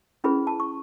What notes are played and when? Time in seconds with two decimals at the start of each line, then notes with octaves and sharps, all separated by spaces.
0.24 C#4 E4 G#4 B4 B5
0.47 A5
0.60 C#6